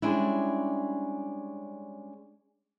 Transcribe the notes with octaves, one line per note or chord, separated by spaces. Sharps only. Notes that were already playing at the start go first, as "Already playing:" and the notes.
G3 G#3 C#4 D4 E4